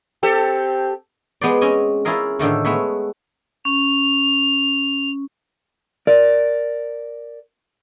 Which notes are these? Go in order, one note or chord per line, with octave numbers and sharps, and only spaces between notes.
C4 G4 A4
G#3 B3 G4 C5 D5
C4 C#4 D#5 G#5
C#4 E4 F4 G#4 A#4
A2 D3 D#3 A3
G#3 A3 B3 B4 C#5 E5
C#4 F7
A#4 D5